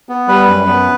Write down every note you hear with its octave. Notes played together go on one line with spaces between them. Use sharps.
B3
G3 B4
F#2
B3